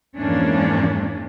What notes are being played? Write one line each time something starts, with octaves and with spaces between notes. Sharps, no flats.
F2 G#2 E3 A#3 C#4 D4